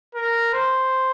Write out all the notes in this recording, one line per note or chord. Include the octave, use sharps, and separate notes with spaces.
A#4
C5